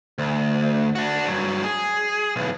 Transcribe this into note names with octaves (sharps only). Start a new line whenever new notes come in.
D2
D4 F#4
G2 F#3
G#4
B1 E2